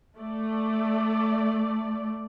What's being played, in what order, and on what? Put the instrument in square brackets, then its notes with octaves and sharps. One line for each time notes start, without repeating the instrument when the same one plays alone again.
[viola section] A3 D5